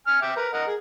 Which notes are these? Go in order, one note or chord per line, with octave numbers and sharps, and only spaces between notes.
G#5 F6
E5 G5 D6
A#4 B4
A#4 D#5 F#5
G#4